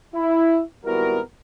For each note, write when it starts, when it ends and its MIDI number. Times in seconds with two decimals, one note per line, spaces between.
0.15 0.61 64
0.85 1.19 32
0.85 1.19 55
0.85 1.19 59
0.85 1.19 64
0.85 1.19 66
0.85 1.19 70